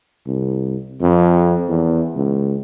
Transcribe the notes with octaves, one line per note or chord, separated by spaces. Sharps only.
C2
F2
E2
C#2